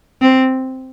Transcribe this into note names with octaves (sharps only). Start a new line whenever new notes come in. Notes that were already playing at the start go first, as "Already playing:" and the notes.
C4